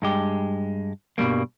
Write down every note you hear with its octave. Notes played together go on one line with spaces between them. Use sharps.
G2 G#3 G4
G2 B2 G3 A#3